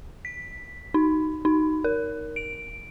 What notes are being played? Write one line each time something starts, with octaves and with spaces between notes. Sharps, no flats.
B6
D#4
D#4
A#4
D7